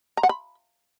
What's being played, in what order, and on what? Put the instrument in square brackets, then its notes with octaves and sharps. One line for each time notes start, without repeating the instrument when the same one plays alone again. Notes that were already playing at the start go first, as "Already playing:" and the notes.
[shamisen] A#5
F#5
B5